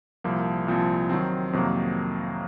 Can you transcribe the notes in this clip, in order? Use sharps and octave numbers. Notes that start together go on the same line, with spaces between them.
C2 A#2 F3 A#3
C2 A#2 F3 C4
D#3 F#3 C4
F2 C3 D#3 F#3 A#3